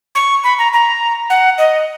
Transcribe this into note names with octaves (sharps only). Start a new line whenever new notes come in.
C#6
B5
A#5
A#5
F#5
D#5